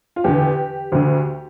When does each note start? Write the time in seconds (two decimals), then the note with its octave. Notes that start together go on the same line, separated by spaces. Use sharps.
0.16 F4
0.24 E2 D3 G4
0.92 D2 D3